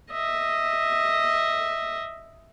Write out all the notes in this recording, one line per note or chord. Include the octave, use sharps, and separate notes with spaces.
D#5 E5